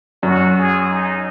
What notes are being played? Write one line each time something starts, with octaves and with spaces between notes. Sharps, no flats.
F#2 F#4
G#4
D#4